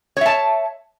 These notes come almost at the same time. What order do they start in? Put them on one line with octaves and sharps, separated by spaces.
C#5 E5 A5